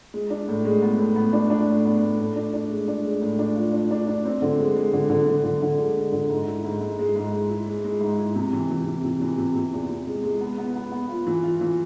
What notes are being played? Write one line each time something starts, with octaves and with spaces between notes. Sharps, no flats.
G#3
D4
A2
G#3
B3
A2
B3
D4
D4
A2
B3
A2
A2
D4
D4
G#3
D4
G#3
A2
D4
F4
D4
D4
D4
C4
D3
G#3
G#3
D3
D3
D3
D3
D3
G#3
G#3
D3
G#2
E4
G#2
G#2
G#3
G#2
G#3
E4
G#3
G#3
G#2
E4
C3
E3
E3
C3
C3
E3
C3
C3
E2
C3
G#3
G#3
B3
B3
B3
B3
F4
E3
F4
E3